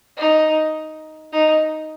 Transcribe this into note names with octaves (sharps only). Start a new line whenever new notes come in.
D#4
D#4